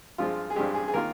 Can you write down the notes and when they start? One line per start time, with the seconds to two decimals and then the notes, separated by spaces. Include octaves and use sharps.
0.18 G2 F3 G#3 F4
0.50 G#4
0.56 G2 F3 G#3 G4
0.74 G#4
0.88 G#4
0.94 D#3 A#3 F4 A#4